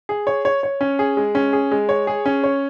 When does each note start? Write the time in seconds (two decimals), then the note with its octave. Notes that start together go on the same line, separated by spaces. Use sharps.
0.09 G#4
0.27 C#5
0.45 C#5
0.63 C#5
0.81 C#4
0.99 G#4
1.17 G#3
1.35 C#4
1.53 G#4
1.71 G#3
1.89 C#5
2.07 G#4
2.26 C#4
2.44 C#5